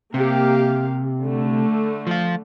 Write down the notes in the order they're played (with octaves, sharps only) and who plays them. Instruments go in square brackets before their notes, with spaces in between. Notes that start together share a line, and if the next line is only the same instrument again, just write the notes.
[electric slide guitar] C3 [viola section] A#3 G4 F5
[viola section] D3 A3
[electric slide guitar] F3 F4